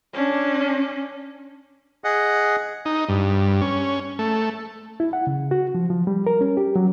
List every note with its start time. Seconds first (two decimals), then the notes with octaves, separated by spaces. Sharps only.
0.14 C#4 D4
2.04 G#4 D#5 F#5
2.85 D#4
3.09 G2
3.61 C#4
4.19 A3
5.00 E4
5.13 F#5
5.27 C#3
5.51 F#4
5.75 F3
5.90 F3
6.07 G3
6.27 A#4
6.41 C#4
6.57 G4
6.76 F#3